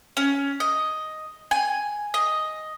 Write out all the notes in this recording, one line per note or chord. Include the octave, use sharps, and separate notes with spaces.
C#4
D#5
G#5
D#5